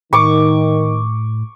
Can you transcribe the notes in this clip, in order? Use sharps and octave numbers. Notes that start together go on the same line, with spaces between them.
A2 D#3 C#6 D6